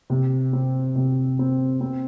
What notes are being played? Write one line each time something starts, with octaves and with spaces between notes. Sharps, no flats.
C3
C4
C3
C4
C4